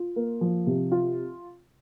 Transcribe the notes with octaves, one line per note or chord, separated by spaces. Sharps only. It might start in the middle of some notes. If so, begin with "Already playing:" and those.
Already playing: F4
A#3
F3
C3
F4